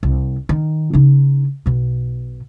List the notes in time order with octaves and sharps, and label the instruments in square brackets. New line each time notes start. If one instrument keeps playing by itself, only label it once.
[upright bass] C2
D#3
C#3 D#4
B1 B2